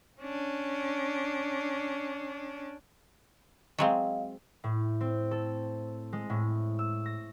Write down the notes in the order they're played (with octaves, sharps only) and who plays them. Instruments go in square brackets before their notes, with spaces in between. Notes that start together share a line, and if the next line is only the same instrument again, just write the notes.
[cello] C#4 D4
[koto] F#3 G#3 C4 [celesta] D#5 F5
[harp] A2
C4
A4
G#3
A2
E6
A#6